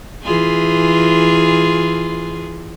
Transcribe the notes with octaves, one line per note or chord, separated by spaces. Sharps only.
E3 F4 G#4